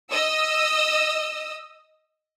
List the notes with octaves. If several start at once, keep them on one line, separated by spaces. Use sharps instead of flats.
D#5 D#6 E6